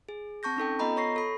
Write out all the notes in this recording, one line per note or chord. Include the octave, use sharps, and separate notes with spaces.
G#4
C4 A5 C#6 G6 A#6
C#4 D#4 A4 G5
B3 F4 A4 D#5 A#5 B5
C#5 C#6 A#6 C7
A4 B5